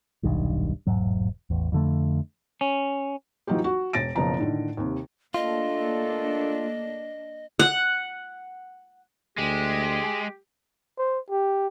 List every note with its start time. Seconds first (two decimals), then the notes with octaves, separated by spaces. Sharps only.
0.23 D#1 B1 G2 D#3
0.87 E1 A1 G#2 F#3
1.50 A1 E2
1.72 F2 D3 A3
2.61 C#4
3.47 E3 F#3 D#4 F4 G4
3.64 F#4
3.93 E1 A6 A#6 D7
4.16 F#1 B2 F3 A5 A#5
4.38 A2 D3 D#3
4.77 D#2 C3
5.34 A#2 A3 A#3 D4 F4 A4 D#5
7.59 F#5
9.38 D2 G#3 G4
10.98 C5
11.30 G4